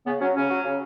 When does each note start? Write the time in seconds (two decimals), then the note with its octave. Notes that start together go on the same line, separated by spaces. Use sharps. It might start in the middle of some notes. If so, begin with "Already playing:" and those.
0.06 C#3 B3
0.20 F#3 C#4
0.35 C#3 C#4
0.49 F#3
0.64 C#3